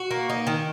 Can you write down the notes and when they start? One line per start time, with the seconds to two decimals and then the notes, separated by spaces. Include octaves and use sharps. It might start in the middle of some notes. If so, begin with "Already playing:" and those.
Already playing: F#4
0.11 A#3
0.30 D#4
0.47 D#3